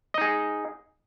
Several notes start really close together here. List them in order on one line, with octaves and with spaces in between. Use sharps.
D#5 D#4 G#4